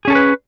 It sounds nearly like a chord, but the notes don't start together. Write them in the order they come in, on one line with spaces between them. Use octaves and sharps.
G#4 C#4 A4 C#5 B4